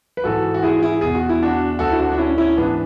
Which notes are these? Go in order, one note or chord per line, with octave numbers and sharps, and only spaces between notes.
B4
G#2 E3 F#4 A4
F#4
E4 G#4
E4 G#4
E2 B2 G#4
F#4
E4
D4 F#4
D2 D3 F#4 A4
E4
D4 F#4
D4
C#4 E4
C#4 E4
G#2 E3 B3 D4